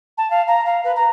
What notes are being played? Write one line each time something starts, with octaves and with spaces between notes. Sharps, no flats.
A5
F5
A#5
F5
B4
A#5